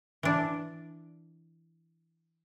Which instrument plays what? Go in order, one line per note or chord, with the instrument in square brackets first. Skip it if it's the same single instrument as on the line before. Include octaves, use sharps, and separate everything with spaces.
[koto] E3 D4